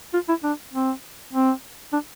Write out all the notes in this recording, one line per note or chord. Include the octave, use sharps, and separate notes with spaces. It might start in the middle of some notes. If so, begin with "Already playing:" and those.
F4
E4
D4
C4
C4
D4